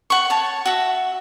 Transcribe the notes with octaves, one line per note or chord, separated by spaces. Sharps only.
F#5 C#6
C#5 A5
F#4 E5